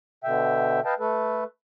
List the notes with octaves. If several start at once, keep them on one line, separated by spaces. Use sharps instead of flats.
B2 D3 E5 G5
B4 D#5 F5 G5 A5
A3 A4 B4